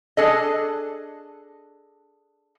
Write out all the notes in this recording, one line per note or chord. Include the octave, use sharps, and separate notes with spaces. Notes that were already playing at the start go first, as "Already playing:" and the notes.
D4 G#4 A4 D#5